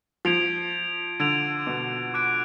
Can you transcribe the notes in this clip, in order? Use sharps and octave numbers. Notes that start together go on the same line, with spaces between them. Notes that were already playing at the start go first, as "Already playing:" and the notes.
F3 G#6 D7 F7
D3 G#6 D7 F7
B2
D6 F#6 D7